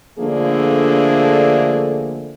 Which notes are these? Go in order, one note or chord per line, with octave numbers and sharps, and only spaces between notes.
D3 F3 A3 A#3 D4 G#4